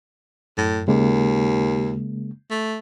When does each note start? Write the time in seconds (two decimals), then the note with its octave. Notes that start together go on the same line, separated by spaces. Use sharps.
0.58 F#2 A2
0.88 D#2 C#3 G#3 A#3
2.50 A3